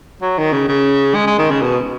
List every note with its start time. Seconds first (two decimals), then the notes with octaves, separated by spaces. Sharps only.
0.22 F#3
0.38 D#3
0.53 C#3
0.68 C#3
1.15 G#3
1.27 G#3
1.38 D#3
1.50 C#3
1.61 B2